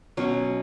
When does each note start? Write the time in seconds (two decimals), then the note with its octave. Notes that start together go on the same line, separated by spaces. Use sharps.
0.17 B2 F#3 C#4